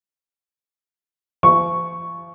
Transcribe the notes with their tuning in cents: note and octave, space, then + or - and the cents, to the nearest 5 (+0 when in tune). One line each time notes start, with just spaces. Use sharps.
F3 -40 C#6 +0